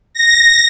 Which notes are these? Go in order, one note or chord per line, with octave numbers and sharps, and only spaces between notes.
A#6